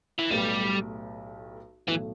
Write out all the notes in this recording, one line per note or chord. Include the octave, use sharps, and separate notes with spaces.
E3
B1 A2 G3 A3 G4 B4
B1 A2 E3 A3